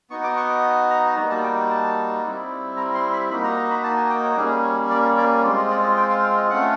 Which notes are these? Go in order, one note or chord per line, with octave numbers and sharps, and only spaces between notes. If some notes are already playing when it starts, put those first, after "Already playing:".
B3 D#4 F#4 C#6
D6
C#6
A#5
G3 A#3 D#4 F#4 A#5
A5
G5
A5
G3 C4 E4
A#5
C6
B5
A#3 D#4 F#4 B5
A#5
A#5
B5
A5
G#5
G5
C#5
G3 A#3 C#4 G#4
C#5
D5
C#5
D5
G#3 C4 F4 D5
D#5
D5
D#5
G5
F5
F5
D#5
A3 C#4 F4 F#5